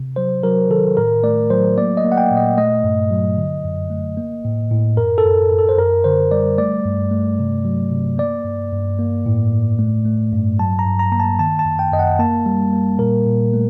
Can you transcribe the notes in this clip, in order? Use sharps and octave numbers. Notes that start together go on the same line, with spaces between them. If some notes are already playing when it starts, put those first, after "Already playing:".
Already playing: C3
F#3 C5
F#3 A#4
D#3 A4
A2 A#4
A3 D5
F#3 C5
A#3 D5
D#5
A#3
F#5
G5
A#2
D#5
A3 D#5
G2
F#3
D3
F#2
A3
A#3
A2
A2
F#2 A#4
A4
F#2
F#2
A4
C5
F#2 A#4
D3 C5
G3 D5
A3 D5
G2
A3
C3
F#3
C3
A#3 D5
G2
G2
A#3
A2
A2
A3
A3
G2
F#3 A5
A#5
G2
A#5
A#3 A#5
A5
D#3 A5
A5
F#2
G5
F#2 D#5
F#5
A#3 A5
G3
A#3
A#2 A#4
A#2
A3